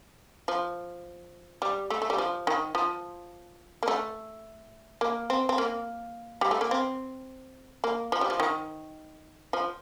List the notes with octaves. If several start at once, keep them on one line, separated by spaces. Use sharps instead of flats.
F3
G3
A3
A3
G3
F3
D#3
F3
A#3
A3
A#3
C4
C4
A#3
G3
A3
A#3
C4
A#3
F3
G3
F3
D#3
F3